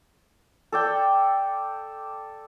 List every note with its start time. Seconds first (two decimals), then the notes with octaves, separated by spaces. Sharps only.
0.72 A4 D5 G5